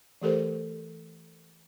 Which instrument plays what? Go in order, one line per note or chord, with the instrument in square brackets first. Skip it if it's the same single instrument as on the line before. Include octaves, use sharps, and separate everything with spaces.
[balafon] E3 A3 G4 A4 A#4 C5